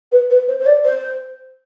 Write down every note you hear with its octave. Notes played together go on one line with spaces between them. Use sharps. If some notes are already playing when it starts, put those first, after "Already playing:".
B4
B4
C5
C5
D5
C5